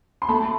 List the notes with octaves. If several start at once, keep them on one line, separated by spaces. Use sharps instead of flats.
C6
A3 A5 B5